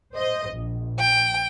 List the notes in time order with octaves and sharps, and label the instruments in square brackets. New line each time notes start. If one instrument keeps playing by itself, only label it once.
[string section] C5 D#5
A#1
[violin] G5